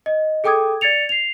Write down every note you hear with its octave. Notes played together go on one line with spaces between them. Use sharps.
D#5
G#4 A4 G5 D6 D#6 G#6
D5 G#6 A6 C#7 F7
C7 F7